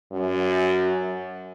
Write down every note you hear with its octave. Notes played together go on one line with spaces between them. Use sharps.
F#2